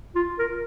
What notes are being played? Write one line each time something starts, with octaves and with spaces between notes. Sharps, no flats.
F4
A#4